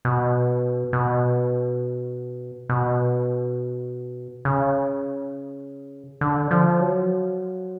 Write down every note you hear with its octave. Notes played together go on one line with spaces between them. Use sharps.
B2
B2
B2
C#3
D3
F3
F#3